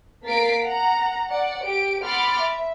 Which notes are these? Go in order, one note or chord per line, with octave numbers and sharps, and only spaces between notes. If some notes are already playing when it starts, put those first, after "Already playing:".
A#3 A#4 A6 B6 C7 D7
F#5 A#5
D5 F#5
G4 D7
F#5 B5 C6 D6 F6 A6
E5